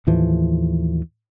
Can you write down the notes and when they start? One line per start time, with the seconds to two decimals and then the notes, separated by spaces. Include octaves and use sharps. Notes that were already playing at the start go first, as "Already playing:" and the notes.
0.07 D#2 A2 E3 F3